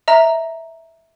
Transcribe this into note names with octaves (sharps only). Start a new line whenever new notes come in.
D#5 E5 A#5